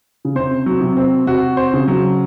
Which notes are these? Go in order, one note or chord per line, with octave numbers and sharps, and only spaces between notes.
C#3
C3 C5
F#3
C3
C4
C3 F#4
C5
C#3
F#3